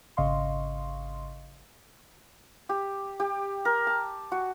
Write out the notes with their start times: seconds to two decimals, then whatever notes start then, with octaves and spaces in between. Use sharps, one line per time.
0.17 G#1 C#3 D#5 F5 C6 C#6
2.69 G4
3.20 G4
3.65 A#4
3.87 A5
4.32 F#4